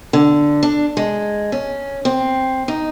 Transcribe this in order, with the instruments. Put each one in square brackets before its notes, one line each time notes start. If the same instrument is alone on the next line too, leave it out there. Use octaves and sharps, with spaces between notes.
[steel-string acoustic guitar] D3
D4
G#3
C#4
C4
D#4